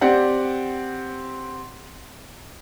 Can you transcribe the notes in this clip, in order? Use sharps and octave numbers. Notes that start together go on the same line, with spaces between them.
C4 G4 D5 F#5